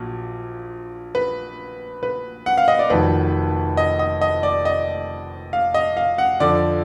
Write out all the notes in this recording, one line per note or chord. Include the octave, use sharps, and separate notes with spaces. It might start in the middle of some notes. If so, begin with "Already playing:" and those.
Already playing: A#1 A#2 F#3
B4
B4
F#5
F5
D#5
D5
F1 F2 D#3 F#3 B4
D#5
D#5
D#5
D5
D#5
F5
D#5
F5
F#5
F2 D3 F3 D5